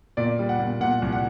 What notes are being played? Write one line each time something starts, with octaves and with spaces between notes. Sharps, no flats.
A#2 D5
G3
F#5
A#2
A#2 F#5
C2
F#5